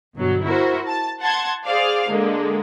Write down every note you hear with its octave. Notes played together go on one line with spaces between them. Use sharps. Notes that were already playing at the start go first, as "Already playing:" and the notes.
G1 B2 F#3
E4 F#4 A#4 C5
A5
F#5 A5 C6 G#6
G#4 C5 D5 F5
D3 G#3 A#3